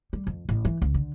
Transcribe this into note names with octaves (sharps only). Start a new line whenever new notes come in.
G3
F2
A1
E3
C#2
D3